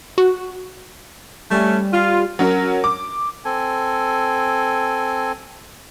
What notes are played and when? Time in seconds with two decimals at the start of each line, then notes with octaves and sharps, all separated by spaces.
0.18 F#4
1.51 G3 A3 C#4
1.92 F4
2.39 F#3 C#4 A#4
2.84 D6
3.45 C4 A4 G#5